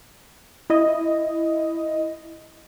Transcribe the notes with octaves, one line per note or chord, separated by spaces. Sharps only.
E4 D#5